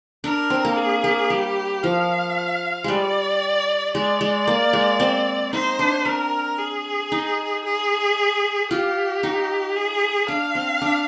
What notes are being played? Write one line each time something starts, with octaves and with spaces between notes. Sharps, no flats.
D4 A#4
C4
A#3
G#4
A#3
G3 G4
F3 F5
G3 G#3 D5
G#3 D5
G#3
A#3
G#3
C4
D#4 C5
D4
C4 A#4
G#4
D#4
G#4
F4 G4
D#4
G#4
D4 F5
C4
D4